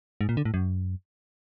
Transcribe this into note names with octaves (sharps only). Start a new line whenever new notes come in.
G#2
A#2
D3
A2
F#2